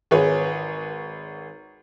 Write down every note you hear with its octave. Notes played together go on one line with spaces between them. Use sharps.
G#1 G#4 B4 C#5